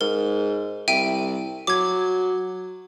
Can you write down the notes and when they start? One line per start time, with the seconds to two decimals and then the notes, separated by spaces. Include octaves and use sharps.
0.01 G#2 A#4
0.88 C2 E5 G5 D#7
1.67 F#3 D6 G#6